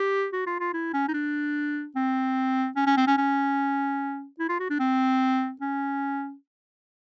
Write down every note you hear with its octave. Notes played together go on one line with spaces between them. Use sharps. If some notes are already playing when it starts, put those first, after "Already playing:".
Already playing: G4
F#4
F4
F4
E4
C#4
D#4
D4
C4
C#4
C#4
C4
C#4
C#4
E4
F4
F#4
D4
C4
C#4